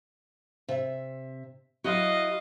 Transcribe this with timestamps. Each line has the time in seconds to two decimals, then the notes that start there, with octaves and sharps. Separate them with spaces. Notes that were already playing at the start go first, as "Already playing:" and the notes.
0.68 C3 E5
1.84 F#3 E4 F#4 D#5 F5